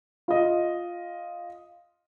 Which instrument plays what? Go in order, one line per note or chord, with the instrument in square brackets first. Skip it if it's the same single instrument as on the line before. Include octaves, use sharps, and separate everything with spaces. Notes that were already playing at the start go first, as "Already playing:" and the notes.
[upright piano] F4 D#5